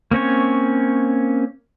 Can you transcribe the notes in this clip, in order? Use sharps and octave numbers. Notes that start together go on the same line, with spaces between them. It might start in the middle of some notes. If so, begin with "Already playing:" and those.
A#3 C4 C#4 C#5